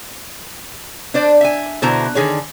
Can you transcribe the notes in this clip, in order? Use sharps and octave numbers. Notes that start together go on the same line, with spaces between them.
D4 C5 D5
E5 G#5
B2 D3 E4 C5 A#5
D3 D#3 G#4 C#5